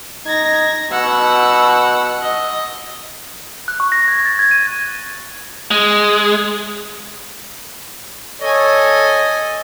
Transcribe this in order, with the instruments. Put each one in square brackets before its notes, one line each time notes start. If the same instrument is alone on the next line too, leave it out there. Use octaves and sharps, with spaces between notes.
[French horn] D#4 [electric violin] G#6 A#6
[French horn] B2 [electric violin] F#5 E6
[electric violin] D#5
[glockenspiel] F#6
C#6
A#6
G#6
A6
G#6
D#7
[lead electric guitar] G#3
[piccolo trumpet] A4 [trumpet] C#5 [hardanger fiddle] D#5 G#5